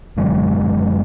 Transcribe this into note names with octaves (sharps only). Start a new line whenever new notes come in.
F#1 D3 F#3 G#3